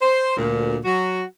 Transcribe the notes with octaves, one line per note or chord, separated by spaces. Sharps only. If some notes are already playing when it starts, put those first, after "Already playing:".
C5
D2 A#2
F#3 F#4